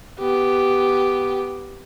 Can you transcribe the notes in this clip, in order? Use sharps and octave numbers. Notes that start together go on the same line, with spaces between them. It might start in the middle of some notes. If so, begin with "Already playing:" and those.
B3 G4